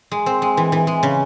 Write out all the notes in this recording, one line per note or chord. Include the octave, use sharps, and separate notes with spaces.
G#3
C4
G#3
E3
E3
G#3
C#3